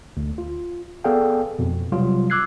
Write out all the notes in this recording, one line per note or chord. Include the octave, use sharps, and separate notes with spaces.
D2
F4
B3 G#4 A4 D5 F5 G5
F2 B2
C3 F#3 G3 F4
D6 E6 F#6 G#6 C7